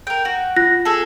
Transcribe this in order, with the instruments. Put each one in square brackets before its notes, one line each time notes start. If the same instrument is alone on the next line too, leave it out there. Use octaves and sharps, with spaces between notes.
[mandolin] A#4 G5
F#4
[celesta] F4 F#6 A#6
[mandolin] G#4 A4